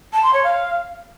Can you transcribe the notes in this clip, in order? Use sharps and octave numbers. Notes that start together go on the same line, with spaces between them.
A5
C6
C#5
F5